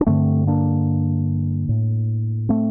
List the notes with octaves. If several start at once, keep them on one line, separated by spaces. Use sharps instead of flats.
D4
G2 D3 A3 C4
A#3 D4
A2
A3 C4